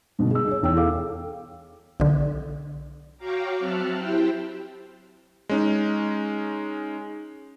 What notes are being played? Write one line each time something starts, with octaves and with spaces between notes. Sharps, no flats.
G2 B2 D3
G#4 E6
G#4 C#5
E2 G5 E6
G#4 A4 F5 D6
B1 D3
F#4 C#5 F5 G5 A#5 D6
F#3 C4 E5 A5 F6 F#6
E4 G4 C5 G5
G#3 C#4 D#4